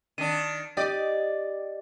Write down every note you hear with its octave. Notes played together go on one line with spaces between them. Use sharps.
D#3 D4 D#7
G4 D5 D#5